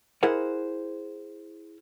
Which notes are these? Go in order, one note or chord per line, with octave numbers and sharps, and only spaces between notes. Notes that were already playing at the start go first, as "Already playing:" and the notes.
E4 G#4 A#4 C5 F#5